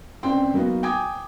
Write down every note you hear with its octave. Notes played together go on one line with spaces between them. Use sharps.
C#2 C4 D4 G5 C6
F#3 A#3 B3 D#4 F#4
G5 G#5 D6 D#6 G#6